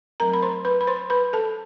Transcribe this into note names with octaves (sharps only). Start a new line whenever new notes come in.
F#3 A3 C4 A#4 A#5
B5
C5 C6
B4 B5
B5
C5 C6
B4 B5
A4 A5